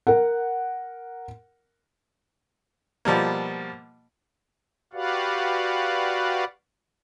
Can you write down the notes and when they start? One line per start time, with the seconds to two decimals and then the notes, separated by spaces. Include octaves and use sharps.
0.07 A#4 F#5
3.05 B2 F3 G3 A#3
4.93 F#4 G4 B4 D5 F5 F#5